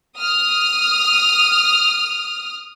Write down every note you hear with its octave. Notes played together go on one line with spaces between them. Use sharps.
D#6 F6